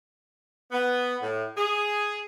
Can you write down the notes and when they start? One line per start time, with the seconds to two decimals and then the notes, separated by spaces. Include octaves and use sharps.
0.72 B3
1.22 A2
1.57 G#4